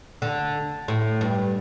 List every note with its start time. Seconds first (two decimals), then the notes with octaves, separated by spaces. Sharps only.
0.22 D3
0.88 A2
1.21 G2